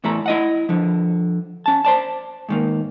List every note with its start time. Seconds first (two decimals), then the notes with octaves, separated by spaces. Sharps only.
0.04 E2 A2 A3 E4 A4 A#5
0.26 E4 D#5 F#5
0.69 D3 F3
1.66 C#4 A5
1.85 C5 D5 A5
2.49 G#2 D#3 A#3